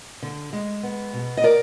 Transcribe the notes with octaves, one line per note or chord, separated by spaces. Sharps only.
D3
G#3
B3
B2
D#5
A#4 D5